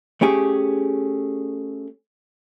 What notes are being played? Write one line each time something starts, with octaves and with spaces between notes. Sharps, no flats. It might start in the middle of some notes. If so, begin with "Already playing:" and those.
A3 C#4 G4 G#4